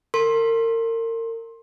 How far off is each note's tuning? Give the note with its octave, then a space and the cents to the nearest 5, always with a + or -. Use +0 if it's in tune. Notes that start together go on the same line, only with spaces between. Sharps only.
A#4 -35 C6 +20